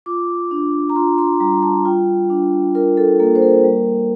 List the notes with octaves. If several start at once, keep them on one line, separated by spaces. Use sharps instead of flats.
F4 D6
D4
A#5
F4 C6
C6
G3 A#5
A5
F4 G5
D4
F4 A#4
A4
A#3 A4
C5
A#4
G3